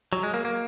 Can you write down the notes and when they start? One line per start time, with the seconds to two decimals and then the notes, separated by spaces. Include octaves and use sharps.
0.13 F#3
0.23 G#3
0.34 A#3
0.45 A#3